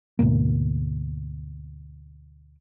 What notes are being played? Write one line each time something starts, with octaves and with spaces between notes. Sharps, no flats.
D2 G#2 B2 A#3